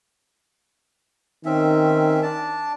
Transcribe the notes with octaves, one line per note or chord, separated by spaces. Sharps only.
D#3 C4 C#4 E5
D4 A5